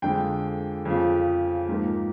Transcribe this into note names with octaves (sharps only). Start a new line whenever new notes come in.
F2 D3 F3 G#3 G5
F2 C#3 F3
G#2 F3 A#3